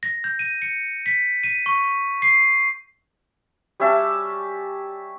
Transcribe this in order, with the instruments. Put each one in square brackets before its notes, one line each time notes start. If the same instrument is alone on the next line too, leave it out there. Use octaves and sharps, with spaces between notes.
[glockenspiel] A#6
G6
D#7
C#7
B6
D#7
C#6
C7
[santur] G3 C#4 E5 A5